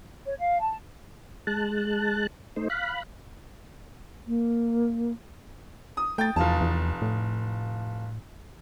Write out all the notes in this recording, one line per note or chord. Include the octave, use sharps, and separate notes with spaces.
C#5
F5
A5
G#3 A5 F#6
A3 D#4 C5
F5 B5 F#6
A#3
D#6
A3 G5 A6
F1 E2 F4 A5
E2
A2